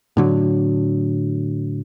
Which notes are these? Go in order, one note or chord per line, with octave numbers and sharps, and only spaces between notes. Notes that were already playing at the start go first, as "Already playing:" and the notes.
A2 D3 F#3